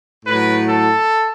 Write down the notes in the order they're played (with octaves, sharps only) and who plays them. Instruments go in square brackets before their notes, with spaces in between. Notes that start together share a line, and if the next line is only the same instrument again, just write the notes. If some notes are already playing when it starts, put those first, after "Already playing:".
[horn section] A2 F#3 B4
A4